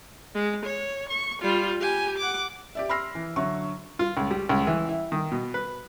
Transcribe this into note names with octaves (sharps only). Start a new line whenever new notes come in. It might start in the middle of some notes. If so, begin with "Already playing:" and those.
G#3
C#5
C#6
G3 F4
G4 G#5
F#5 D6
G4 D5 E5
B5 C6 E6 F6 A#6 C7
E3
D3 F#3 E5 C#6
F4
C#2
G3
C#2
E3
E4
D#3
B2
B4